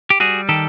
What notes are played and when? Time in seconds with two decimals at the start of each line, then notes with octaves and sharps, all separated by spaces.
0.10 G4
0.20 G3 F#4 G#4
0.49 D#3 G4 A4